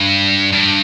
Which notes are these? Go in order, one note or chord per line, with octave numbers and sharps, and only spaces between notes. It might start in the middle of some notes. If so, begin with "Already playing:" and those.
Already playing: G2
G2